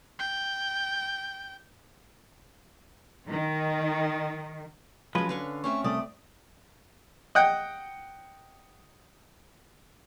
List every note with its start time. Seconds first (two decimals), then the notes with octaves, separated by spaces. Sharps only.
0.19 G5
3.28 D#3
5.15 F3 F#3 G#3 C#4 B4
5.29 D3 B4 F5 C#6
5.64 A3 C4 C#4 C#6
5.84 C2 A3 D5 D#6
7.35 D#5 F#5 G5